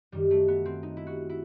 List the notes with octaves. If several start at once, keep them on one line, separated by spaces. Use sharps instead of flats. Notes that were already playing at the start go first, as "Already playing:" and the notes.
F#2 D#3 G3
A3
B3
C4
D#4
E4
F#4
E4